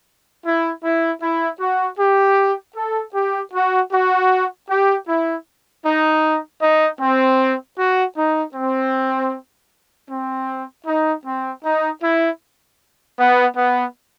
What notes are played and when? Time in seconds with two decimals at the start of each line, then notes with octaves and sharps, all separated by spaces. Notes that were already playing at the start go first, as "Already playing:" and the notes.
0.44 E4
0.84 E4
1.22 E4
1.60 F#4
1.99 G4
2.76 A4
3.14 G4
3.53 F#4
3.92 F#4
4.69 G4
5.08 E4
5.86 D#4
6.62 D#4
7.01 C4
7.78 F#4
8.17 D#4
8.55 C4
10.10 C4
10.87 D#4
11.26 C4
11.65 D#4
12.03 E4
13.19 B3
13.57 B3